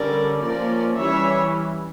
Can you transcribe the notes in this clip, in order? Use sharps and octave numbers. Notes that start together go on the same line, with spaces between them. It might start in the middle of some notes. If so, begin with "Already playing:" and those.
Already playing: D3 G3 C#4 A#4 D5
F3 A#3 C#4 A#4 D5
E3 G3 C#4 C#5 E5